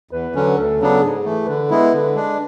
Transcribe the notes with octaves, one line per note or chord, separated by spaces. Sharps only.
E2 B4
D3 F#3 C#4
D2 A4
C#3 F#3 B3 D4
G#2 G#4
E3 A3
D3 B4
G#3 B3 E4
D3
G#3 D4